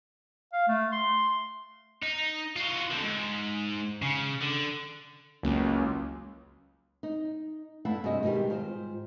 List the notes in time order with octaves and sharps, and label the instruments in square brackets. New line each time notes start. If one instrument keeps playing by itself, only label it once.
[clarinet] F5
A3
C6
[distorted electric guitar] D#4
F4 F#4
D3 C4
G#2
C#3
D3
[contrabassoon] F#1 [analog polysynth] C#2
[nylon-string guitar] D#4
G2 A3 E4 F5 F#5
G2 C3 F#4 G#4 D#5
G#2 B2 D#3 G3 G4
G#2 F4 C5